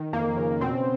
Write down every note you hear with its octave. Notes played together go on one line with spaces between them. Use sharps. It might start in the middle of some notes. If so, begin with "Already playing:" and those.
Already playing: D#3
F2 A#3
C#3
B2 C4